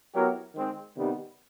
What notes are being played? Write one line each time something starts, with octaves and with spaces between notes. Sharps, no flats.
F#3 B3 E4 G4 A#4
D#3 G#3 C4
C3 D#3 G3 B3 D#4